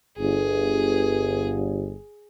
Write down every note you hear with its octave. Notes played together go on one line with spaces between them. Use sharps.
G1 G#4